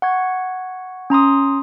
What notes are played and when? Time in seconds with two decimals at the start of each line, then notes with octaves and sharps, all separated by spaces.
0.02 F#5 C#6 G#6
1.10 C#4 A#5 C6 D#6